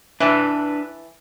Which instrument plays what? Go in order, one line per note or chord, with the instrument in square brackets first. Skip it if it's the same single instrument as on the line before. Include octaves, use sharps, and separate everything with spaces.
[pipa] E3 A4 [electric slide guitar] D4 B4 E5